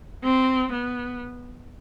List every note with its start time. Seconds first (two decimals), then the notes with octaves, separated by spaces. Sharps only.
0.23 C4
0.73 B3